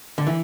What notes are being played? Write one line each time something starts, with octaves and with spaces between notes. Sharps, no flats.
D3
E3